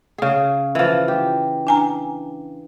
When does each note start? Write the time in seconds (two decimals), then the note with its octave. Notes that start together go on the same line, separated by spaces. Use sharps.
0.18 C#3 G#4
0.75 E3 F3
1.08 G4
1.67 D4 G#5 A#5